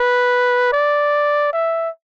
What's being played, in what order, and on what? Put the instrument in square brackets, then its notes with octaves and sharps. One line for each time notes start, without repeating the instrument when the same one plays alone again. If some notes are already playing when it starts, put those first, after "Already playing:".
Already playing: [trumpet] B4
D5
E5